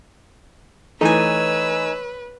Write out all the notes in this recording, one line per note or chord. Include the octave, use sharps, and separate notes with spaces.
E3 A3 D#4 B4 C#5 G#5 E6